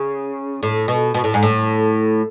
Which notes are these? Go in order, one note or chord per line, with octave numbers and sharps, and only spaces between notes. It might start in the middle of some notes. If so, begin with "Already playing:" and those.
Already playing: C#3
A2
B2
B2
A2
G#2
A2